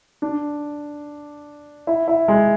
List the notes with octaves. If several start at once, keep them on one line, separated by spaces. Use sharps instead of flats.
D4
E4
E4
G#3